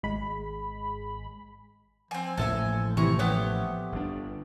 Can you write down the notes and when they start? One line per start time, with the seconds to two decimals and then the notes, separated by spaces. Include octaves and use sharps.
0.03 G#1 G#3 B5
2.11 F3 C4 G#5
2.37 A1 A2 A#3 A4 E5 G#5
2.97 C3 E3 A#5 C#6
3.19 A3 B3 G4 C#5
3.92 G1 D4